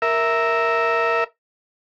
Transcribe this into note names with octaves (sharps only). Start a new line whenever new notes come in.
A#4 E5